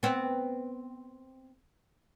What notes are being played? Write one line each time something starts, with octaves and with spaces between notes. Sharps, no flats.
B3 C4